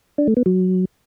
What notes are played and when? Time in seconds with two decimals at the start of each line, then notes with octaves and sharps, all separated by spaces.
0.18 D4
0.27 A3
0.37 B3
0.46 F#3